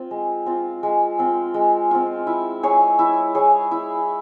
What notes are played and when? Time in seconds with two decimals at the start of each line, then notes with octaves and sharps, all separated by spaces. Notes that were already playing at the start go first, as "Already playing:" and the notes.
Already playing: C4 F4
0.11 G#3
0.46 C4 F4
0.83 G#3
1.19 C4 F4
1.54 G#3
1.91 C4 F4
2.27 E4
2.63 G#4 C#5
2.99 E4
3.35 G#4 C#5
3.71 E4